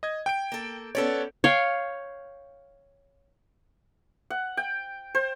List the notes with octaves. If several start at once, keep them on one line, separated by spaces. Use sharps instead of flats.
D#5 G#6
G5 G6 D7
A#3 A4
B3 C#4 A4 C#5 D5
C#5 F5 G5
F#5
G5
C5